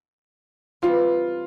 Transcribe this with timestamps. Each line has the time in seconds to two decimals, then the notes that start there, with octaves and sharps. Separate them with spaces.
0.82 E3 G3 C4 F4 G4